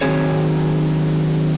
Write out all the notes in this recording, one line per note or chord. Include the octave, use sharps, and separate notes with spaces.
D#3 F3 F#3 C4 G#4 C#5